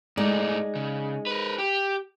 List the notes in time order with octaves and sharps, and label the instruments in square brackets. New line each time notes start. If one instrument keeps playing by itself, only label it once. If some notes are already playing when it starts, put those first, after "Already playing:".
[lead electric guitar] G#2 A3 [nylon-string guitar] G#3 D#4 D5
[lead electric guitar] C#3
A#4 B4
G4